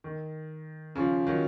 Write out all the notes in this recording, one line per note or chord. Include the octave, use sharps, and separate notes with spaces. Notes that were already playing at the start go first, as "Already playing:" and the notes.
D#3
C#3 F3
D#3 F#3